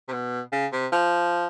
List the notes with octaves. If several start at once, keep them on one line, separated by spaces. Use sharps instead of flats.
C3
B2
C#3
C3
F3